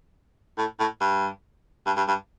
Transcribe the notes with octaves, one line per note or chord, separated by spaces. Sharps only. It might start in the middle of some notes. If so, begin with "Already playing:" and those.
A2
A2
G2
G2
G2
G2